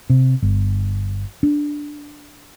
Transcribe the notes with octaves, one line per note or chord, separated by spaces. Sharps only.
C3
G1
D4